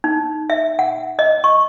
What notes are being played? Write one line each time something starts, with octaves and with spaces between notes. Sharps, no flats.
D#4
E5
F#5
D#5
C#6